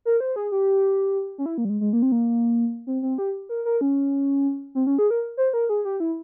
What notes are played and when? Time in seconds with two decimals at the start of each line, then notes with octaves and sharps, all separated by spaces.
0.05 A#4
0.20 C5
0.36 G#4
0.52 G4
1.38 C#4
1.46 E4
1.58 A#3
1.65 G3
1.70 G#3
1.81 G#3
1.93 A#3
2.02 C4
2.12 A#3
2.87 C4
3.02 C4
3.18 G4
3.49 A#4
3.65 A#4
3.81 C#4
4.75 C4
4.87 C#4
4.98 G#4
5.10 A#4
5.37 C5
5.54 A#4
5.69 G#4
5.85 G4
6.00 E4